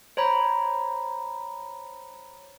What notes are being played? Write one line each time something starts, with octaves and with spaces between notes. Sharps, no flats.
C5 C#5 A#5 B5